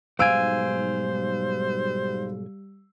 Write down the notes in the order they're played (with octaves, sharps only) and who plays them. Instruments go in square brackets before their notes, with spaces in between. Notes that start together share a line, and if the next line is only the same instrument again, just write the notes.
[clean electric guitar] B1 G#2 G#5 [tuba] G3 [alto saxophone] C5 [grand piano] F5 E6 D7